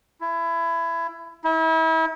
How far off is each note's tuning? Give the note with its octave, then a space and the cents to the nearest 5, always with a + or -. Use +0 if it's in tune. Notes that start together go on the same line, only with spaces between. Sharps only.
E4 +20
E4 -35